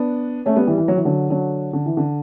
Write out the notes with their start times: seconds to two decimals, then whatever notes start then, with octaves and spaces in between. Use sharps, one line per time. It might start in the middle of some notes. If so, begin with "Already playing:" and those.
Already playing: B3 D4
0.46 A3 C#4
0.56 G3 B3
0.67 E3 G3
0.78 E3
0.88 F#3
0.97 E3
1.05 D3 F#3
1.30 D3 F#3
1.73 D3
1.86 E3
1.97 D3